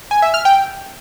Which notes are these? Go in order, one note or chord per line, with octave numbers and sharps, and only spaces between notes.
G#5
E5
F6
G5